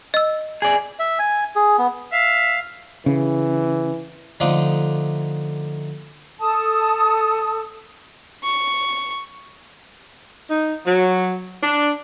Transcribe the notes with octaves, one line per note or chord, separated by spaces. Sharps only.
D#5 E6
G#4 D5
E5
G#5
G#4
B3
E5 F5
C#3 E3
D3 F3 A3 D4 D#4
A4 A5 D#6
C#6
D#4
F#3
D4